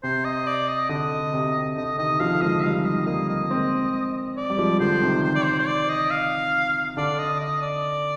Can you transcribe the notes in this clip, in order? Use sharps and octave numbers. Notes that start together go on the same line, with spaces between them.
C3 C5
D#5
D5
D#5
D3 D#5
C3
C3
D3 D#5
C3 D#3 D#5
D3 F3 F5
F3 G#3 D#5
D#3 G3 F5
D#5
G3 A#3 D#5
D#5
G#3 C4
D5
G3
F3 G#3
D3 F3 C5
C3 D#3
C5
D5
C5
C5
D5
D#5
F5
D3 D5
D#5
D#5
D5